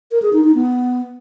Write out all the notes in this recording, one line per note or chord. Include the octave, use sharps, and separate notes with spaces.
A#4
G#4
D#4
D#4
B3